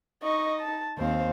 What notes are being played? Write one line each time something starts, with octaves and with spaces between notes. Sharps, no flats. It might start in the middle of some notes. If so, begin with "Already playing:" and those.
D#4 D#5 C#6
A5
D#2 C4 C5 F5